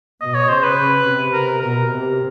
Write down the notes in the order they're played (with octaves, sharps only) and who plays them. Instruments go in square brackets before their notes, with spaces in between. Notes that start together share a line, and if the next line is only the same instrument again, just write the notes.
[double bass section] B2 [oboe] D#5
[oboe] C#5
[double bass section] C#3 [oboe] C5
[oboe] B4
[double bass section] C#3
C3
[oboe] A#4
[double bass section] B2 [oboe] A#4
[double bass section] C3